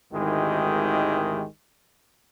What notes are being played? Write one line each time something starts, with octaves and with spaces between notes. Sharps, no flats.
G#1 D2 D#3 G#3 E4 G4